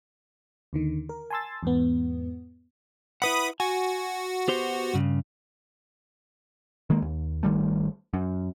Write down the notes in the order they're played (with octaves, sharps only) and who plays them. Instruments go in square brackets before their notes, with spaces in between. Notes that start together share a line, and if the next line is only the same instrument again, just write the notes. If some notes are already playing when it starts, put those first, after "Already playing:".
[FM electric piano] D#2 D3 D#3
A#4
G#5 A5 C6 E6 A6
E2 G#2 B3
[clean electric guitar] E4 B4 F#5 [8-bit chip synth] B5 D#6
[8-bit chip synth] F#4 [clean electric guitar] G#5
[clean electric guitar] B3 G4 C5
G2 C#3
[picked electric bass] D#3 G#3 A#3
D#2
G#1 D#3 G3 A3
F#2